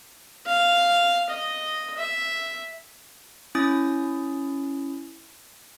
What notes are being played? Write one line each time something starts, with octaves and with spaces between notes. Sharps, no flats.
F5
D#5
E5
C#4 E4 D#6 A6